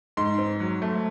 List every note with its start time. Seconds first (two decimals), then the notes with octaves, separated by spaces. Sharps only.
0.17 G#2 C6
0.38 C4
0.60 F#3
0.82 A3